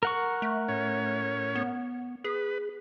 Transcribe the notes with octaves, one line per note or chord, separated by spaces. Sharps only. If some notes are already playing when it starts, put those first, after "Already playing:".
A#4 F#5 C#6
A3
A2 C#4 C#5
B3
G#4 B4